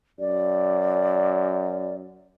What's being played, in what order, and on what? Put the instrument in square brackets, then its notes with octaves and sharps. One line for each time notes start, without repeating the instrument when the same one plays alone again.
[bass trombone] F#2 [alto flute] D5